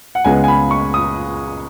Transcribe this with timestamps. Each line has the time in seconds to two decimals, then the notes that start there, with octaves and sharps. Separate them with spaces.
0.15 F#5
0.25 C#2 C#3 G#3 B3 G#5
0.44 G#5
0.48 B5
0.71 C#6
0.94 D#6